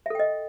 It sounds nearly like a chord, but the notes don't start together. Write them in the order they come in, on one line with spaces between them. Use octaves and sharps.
E5 A4 G5 D#5